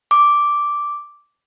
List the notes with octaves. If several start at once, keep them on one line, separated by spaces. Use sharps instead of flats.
D6